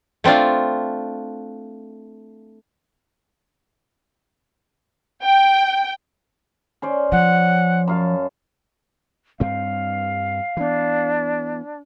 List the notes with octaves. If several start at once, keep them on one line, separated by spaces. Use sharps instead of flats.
A3 C4 D4 F4
G5
C#4 C5 D5
F3 F#5
F#2 F5 A5
G2 C4 F5
E3 B3 D4